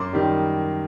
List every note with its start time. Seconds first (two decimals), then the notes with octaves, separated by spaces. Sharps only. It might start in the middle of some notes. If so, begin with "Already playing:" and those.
Already playing: F#2 C6 D6
0.13 D#3 G3